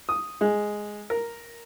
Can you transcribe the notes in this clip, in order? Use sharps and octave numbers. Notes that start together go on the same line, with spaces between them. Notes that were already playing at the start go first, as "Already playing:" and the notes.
D#6
G#3
A#4